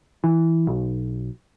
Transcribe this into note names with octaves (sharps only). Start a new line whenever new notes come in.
E3
B1